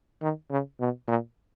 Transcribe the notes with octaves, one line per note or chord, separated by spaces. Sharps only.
D#3
C#3
B2
A#2